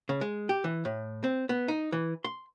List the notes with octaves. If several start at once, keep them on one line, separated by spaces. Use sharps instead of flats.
C#3
G#3
G4
E3
A2
C4
B3
D#4
E3
C6